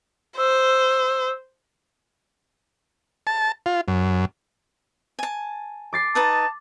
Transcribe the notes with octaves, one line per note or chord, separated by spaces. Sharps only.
C5 E6
A5
F4
F#2
G#5 A5
D6 A6 C7
D#4 B4 A5 D#6